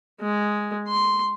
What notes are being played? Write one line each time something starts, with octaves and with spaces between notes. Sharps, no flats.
G#3
C6